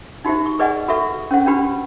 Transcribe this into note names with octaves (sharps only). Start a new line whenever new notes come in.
D#4 F#4 G4 C5 E5
C#6
G#4 B4 D5 D#5 F#5 G#5
F#4 A4 B4 E5 C#6
C#4 C5 F#5
C#4 D4 F#4 G4 B4 B5